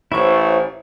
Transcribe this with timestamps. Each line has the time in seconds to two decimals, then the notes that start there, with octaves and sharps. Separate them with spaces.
0.12 A1 E4 C5 C#5 C#6 E6